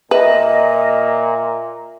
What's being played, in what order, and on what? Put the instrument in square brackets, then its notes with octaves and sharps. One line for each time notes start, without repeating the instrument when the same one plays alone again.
[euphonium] A#2 [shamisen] B4 [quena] D#5 [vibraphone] E5